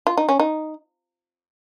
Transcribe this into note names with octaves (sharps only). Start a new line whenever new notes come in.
F4
D#4
C#4
D#4